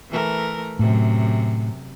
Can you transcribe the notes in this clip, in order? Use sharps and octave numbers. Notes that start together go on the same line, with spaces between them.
E3 A3 A#4
F#2 A2 C3